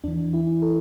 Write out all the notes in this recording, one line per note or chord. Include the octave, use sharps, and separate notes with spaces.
E2 E3 D4
E4
A4